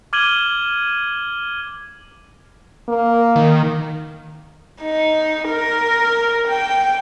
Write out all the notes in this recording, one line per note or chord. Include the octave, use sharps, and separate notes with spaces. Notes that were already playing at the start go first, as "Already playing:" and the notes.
D6 F6 G#6 D#7 F#7 G7
A#3
D#3
D#4
A#4
G5